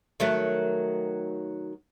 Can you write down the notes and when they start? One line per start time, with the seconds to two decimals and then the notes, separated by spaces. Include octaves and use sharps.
0.20 D#3 F#3 A3